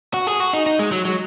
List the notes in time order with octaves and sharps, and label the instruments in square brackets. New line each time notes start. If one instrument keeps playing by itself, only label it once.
[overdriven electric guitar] F#4
G#4
F#4
D#4
D#4
G#3
F#3
F#3